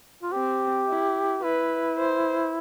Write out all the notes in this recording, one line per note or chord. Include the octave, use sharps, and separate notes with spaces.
F4
C4 G4
E4
E4 B4
C5